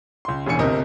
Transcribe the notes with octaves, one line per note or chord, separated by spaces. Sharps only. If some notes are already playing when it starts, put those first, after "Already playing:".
C#2 C6
E1 A1 D4 G#5 C#7
G1 D2 C3 A#4 D#5